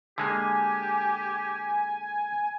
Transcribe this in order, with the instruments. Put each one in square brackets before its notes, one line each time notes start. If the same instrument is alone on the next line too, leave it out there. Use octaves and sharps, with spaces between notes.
[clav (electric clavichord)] D3 G#3 A#3 [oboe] G4 [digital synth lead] G#5